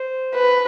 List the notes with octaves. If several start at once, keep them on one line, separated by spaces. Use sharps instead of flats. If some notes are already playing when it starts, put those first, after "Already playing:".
Already playing: C5
B4